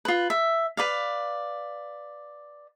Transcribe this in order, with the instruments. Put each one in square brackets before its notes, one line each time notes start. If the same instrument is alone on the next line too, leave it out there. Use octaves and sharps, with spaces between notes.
[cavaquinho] F4 B4
E5
B4 D5 F5